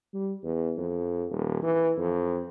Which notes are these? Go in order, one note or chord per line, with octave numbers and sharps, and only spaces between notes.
G3
E2
F2
D#1
E3
F2